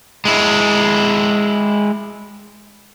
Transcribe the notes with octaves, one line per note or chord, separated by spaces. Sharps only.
G#3 E4